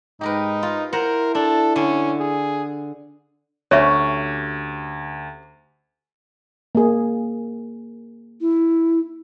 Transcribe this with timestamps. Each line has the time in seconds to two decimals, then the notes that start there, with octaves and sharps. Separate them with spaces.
0.21 G#2 D#4 G4 A#4 B4
0.63 F4
0.93 E4 A#4 C5 F#5 A#5
1.35 D4 A4
1.76 D3 C#4
2.19 G#4
3.71 D2 C#4 F#4 G4 C#5 E5
6.75 A#3 G#4
8.41 E4